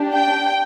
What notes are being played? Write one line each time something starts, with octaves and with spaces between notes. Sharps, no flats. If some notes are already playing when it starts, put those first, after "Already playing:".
Already playing: D4 G4
G5